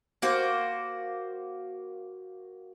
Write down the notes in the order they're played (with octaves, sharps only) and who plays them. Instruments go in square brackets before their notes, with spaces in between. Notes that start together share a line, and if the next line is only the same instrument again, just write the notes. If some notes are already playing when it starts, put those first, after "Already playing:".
[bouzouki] A#3 F#4 C5